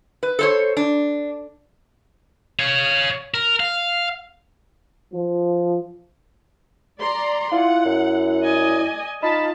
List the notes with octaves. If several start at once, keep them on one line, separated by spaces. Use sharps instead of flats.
B4
A4 C5 C#5
D4
C#5 F5
A#4
F5
F3
D5 A#5 C6
E4 F4 F#5
F#2
D5 D#5 G#5
D#4 F4 A5 B5